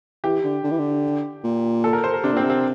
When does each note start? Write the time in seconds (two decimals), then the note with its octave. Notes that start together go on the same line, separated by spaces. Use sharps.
0.24 E3 G4
0.44 D3
0.63 D3
0.71 E3
0.78 D3
1.44 A#2
1.84 A4
1.93 A#4
2.04 C5
2.14 A#4
2.24 C3 D4
2.34 A#2 C4
2.44 C3
2.50 C4